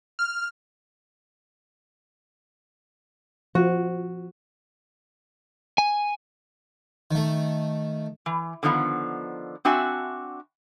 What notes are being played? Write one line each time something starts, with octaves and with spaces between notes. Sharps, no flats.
F6
F3 F#4
G#5
D#3 A3
E3
D3 D#3 F3 A#3 B3
C4 D4 F#4 E5 G#5